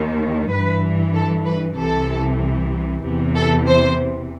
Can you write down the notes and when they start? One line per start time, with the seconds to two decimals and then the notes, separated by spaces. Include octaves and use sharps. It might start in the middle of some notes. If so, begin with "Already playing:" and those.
Already playing: D#2 D#3
0.51 G2 E3 B4
1.14 A4
1.45 B4
1.78 C2 C3 E3 A4
3.04 E2 C3 E3
3.36 A4
3.67 C5